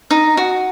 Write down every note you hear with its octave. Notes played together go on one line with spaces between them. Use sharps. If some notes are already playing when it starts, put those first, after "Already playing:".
D#4
F#4